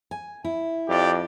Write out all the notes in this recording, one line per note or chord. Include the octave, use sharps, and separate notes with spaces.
G#5
E4
F2 G4 D5